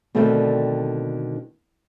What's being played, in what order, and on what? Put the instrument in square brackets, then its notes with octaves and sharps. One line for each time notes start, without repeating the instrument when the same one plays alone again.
[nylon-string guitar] B2 D3 D#3 G3 A3 C4